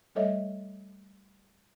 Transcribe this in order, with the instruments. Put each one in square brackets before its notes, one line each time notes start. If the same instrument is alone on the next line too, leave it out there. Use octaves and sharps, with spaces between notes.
[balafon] G3 A3 A4 C#5 D#5 E5